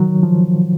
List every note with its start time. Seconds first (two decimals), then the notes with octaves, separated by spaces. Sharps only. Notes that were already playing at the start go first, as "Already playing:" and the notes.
Already playing: D#3 F#3
0.23 F3